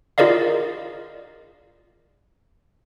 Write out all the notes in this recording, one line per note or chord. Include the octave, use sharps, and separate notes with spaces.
F4 G#4 A#4 D5 D#5 F5